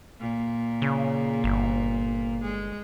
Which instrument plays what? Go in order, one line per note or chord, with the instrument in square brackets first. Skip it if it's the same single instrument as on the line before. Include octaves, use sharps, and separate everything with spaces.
[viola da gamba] A#2
[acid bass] C#3
G1
[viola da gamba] G#3